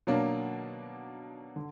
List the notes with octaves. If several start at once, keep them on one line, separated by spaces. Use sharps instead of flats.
B2 F#3 A#3 D4
D3